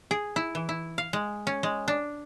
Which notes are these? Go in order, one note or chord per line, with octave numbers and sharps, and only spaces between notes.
G#4
E4
E3
E4
F5
G#3
C#4
G#3
D4